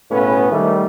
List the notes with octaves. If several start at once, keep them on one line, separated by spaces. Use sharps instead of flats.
B1 A2 C#3 B3 C#4 B4
D#3 G3 A3